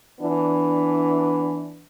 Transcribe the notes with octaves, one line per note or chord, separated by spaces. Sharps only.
E3 B3 D4